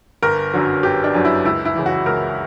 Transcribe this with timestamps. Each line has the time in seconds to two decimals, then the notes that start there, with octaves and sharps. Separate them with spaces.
0.22 G1 A#4
0.54 F#2 D3 F#3
0.83 G1 G4
1.04 D4
1.14 F#2 D3 F#3
1.25 E4
1.45 C#2 E4
1.65 E4
1.75 C#3 E3
1.86 F#4
2.06 C#2 A#4